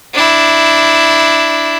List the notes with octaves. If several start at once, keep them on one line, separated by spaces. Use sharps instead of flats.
D4 E4